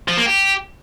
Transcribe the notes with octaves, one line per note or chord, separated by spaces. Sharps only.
F3
A#3
G4